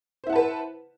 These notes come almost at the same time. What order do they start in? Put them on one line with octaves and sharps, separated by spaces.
C5 E4 F#5 A5 B4